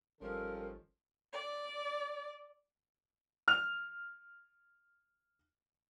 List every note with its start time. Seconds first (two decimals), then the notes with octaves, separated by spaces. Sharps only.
0.21 G#1 D#3 F3 G3 C#4 A4 A#4
1.32 D5
3.48 F6 F7